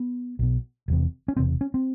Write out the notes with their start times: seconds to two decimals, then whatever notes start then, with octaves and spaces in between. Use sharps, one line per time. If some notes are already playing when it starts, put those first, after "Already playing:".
Already playing: B3
0.39 B1 B2
0.88 E1 E2 C3
1.28 C#4
1.37 E1 E2 C3 C4
1.61 C#4
1.74 C4